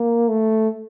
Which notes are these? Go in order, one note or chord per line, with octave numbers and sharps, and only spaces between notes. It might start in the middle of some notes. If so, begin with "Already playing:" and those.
Already playing: A#3
A3